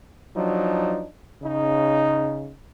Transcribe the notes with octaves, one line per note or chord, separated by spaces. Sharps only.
F3 F#3 D4 D#4
C#3 D#4